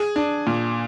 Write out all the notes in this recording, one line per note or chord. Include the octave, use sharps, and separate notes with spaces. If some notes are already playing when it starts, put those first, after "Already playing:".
Already playing: G#4
D4
A#2